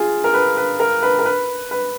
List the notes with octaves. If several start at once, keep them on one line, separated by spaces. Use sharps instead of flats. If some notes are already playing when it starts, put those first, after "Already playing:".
Already playing: F4 G#4
A#4
B4
B4
A#4
B4
A#4
B4
B4